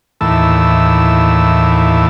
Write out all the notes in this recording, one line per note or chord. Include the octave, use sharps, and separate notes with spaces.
D#2 A2 E3 A5 E6